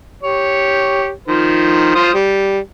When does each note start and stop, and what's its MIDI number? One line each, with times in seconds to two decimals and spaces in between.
0.23 1.10 67
0.23 1.10 73
1.28 1.91 51
1.28 1.91 53
1.28 1.91 72
1.95 2.11 65
1.95 2.11 72
1.95 2.11 87
2.14 2.59 55